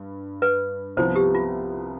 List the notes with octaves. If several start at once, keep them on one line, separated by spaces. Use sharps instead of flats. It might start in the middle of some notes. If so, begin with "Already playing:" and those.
Already playing: G2
B4
C2 C3 F3 B3 C5
G4
F4